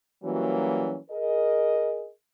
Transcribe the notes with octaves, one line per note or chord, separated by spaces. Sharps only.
E3 F#3 G3 A#3 C#4 F#4
G#4 A#4 D#5